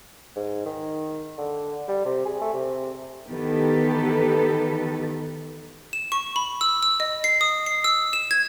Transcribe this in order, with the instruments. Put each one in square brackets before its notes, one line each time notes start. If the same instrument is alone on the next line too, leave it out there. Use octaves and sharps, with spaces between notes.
[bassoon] G#2
D#3
D3
G3
C3
G#4
A3
C3
[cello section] D#3 E3 B3 G4 A4 B4
[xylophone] E7
C#6
B5
E6
E6
D#5
C7
D#6
C7
E6
E7
G#6